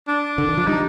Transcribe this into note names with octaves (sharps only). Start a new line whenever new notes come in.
D4
D3
D#3
F3
G3 D#4